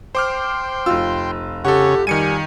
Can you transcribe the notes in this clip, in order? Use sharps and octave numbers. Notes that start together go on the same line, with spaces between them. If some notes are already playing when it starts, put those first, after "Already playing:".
C5 G5 C6 D6 F6
F1 F4 E6
C#3 G4 A4 C#5 F#5
D#3 G3 G#5 C#7 D#7